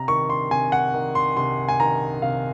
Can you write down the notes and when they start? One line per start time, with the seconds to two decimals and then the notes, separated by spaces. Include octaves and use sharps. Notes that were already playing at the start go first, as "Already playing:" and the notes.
Already playing: C3 A#5
0.08 D#3 C#6
0.30 C6
0.51 C3 G#5
0.72 F#5
0.94 D#3
1.15 C6
1.37 C3 C6
1.69 G#5
1.80 D#3 A#5
2.22 C3 F5